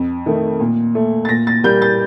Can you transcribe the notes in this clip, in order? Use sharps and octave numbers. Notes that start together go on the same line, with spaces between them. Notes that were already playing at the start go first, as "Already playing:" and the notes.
Already playing: F2
D#3 A3
A#2
A3
A6
A#2 A#6
A6
G3 A#3 G6
A6